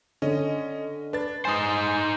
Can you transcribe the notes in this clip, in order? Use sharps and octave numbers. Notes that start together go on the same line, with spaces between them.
D3 C#4 D#5
D4 B4 A6
D#4 C5 G#5 C6 D#6